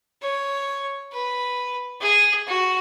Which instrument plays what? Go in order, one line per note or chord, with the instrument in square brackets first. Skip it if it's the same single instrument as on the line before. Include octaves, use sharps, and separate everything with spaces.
[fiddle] C#5
B4
G#4
F#4